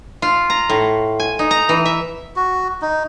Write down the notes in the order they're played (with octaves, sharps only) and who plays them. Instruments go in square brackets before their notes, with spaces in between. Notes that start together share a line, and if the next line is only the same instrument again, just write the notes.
[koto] F4
A#5
A2
G#5
D#4
A#5
E3
E5
[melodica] F#4
D#4